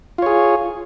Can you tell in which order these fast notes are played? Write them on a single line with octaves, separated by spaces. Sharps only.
F4 C#5 G#4